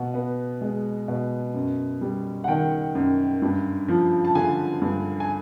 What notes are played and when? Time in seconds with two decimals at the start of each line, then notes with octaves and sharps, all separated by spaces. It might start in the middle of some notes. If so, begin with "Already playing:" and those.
Already playing: B2 F#5
0.14 B3
0.61 G#3
1.08 B2
1.54 F#2
2.01 G3
2.44 F#5
2.48 D#3 G5
2.95 F#2
3.42 G2
3.88 F3
4.25 A5
4.35 D3 G#5
4.82 G2
5.20 G#5